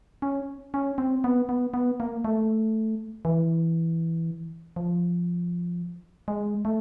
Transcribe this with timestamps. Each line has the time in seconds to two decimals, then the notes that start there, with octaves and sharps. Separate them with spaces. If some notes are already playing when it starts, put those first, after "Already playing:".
0.22 C#4
0.74 C#4
0.98 C4
1.24 B3
1.49 B3
1.74 B3
2.00 A#3
2.25 A3
3.25 E3
4.76 F3
6.28 G#3
6.65 A3